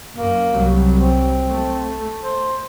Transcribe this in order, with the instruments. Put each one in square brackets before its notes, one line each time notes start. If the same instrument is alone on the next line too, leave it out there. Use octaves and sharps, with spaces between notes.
[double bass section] F#2 [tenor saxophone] A#3
[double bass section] C2 F#3 G3
[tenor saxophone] C4
[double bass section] A3
[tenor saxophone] C5